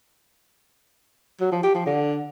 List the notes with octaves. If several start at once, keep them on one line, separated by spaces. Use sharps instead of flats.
F#3
F3
G4
F3
D3